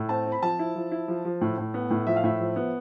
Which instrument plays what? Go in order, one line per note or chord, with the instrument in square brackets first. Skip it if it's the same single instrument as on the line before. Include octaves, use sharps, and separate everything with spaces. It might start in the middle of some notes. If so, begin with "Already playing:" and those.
Already playing: [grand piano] A2
C4 A5
C4
B5
F3 A5
E4
F3
E4
F3
F3
A2
A2
B3
A2
F3 E5
F5
A2 E5
F3
B3